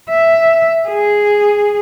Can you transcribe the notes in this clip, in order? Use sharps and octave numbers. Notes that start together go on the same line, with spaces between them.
E5
G#4